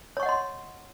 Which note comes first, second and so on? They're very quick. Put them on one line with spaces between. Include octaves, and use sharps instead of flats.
C#5 C#6 F#5 D#5 C6